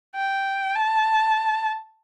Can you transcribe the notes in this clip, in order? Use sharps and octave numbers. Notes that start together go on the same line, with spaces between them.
G5
A5